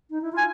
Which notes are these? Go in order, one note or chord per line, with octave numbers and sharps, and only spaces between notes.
D#4
E4
F4
G#5